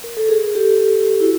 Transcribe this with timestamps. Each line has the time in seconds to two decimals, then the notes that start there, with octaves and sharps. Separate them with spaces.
0.04 A#4
0.17 A4
0.29 G#4 A#4
0.55 G4 A4
1.10 G4
1.20 E4 F#4